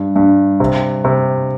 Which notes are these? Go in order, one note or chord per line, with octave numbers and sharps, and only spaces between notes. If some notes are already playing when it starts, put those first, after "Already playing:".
Already playing: G2
G2
C3
C3